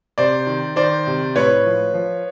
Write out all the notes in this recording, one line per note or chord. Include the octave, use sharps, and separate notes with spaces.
C3 C5 D5
D#3
D#3 C5 D5
C3
A2 B4 C#5
F3
F3